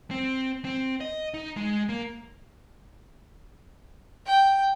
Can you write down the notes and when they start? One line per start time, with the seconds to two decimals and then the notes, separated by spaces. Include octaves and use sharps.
0.11 C4
0.65 C4
1.01 D#5
1.34 D#4
1.57 G#3
1.89 A#3
4.26 G5